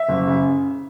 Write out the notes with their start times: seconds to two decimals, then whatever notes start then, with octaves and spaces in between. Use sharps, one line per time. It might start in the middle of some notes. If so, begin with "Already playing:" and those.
Already playing: E5
0.09 F#1
0.27 C#3